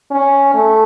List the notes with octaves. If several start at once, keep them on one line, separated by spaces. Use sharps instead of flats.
C#4
A3